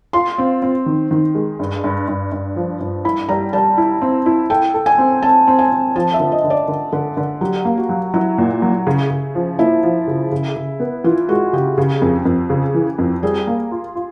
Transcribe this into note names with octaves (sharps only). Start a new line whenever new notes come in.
F4 C6
C4
C4
D#3
D#3
G#3
G2
G2
G2
G2
F3
G2
E4 B5
G3 A#5
G3 A5
E4
C4
E4
A4 G5
A4
G#5
C4
C4 A5
C4
G#5
C4
F3 A5
E5
D3
D#5
D3
D5
D3
D3 A4
D3
F#3 G4
A#3
F#4
F#3
F#3 E4
A#2
F#3
C#3
C#3
F3
A#3 E4
F3
C#3
C#3
C#3
B3
E3 F4
G#3 F#4
C#3 G4
C#3
F2
F2
C#3
E3
F2
G3 G#4
A#3
F4
F4